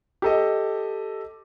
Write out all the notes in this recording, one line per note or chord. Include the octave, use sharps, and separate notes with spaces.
G4 A4 D#5